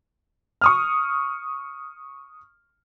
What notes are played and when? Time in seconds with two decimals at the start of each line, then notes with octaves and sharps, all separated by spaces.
0.61 C#6 D#6 F6